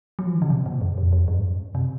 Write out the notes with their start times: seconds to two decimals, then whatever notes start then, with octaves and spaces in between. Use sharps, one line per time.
0.19 F#3
0.27 F3
0.35 D#3
0.42 C#3
0.50 C3
0.66 A#2
0.81 F#2
0.98 F2
1.13 F2
1.28 F#2
1.38 G#2
1.43 F#2
1.75 C3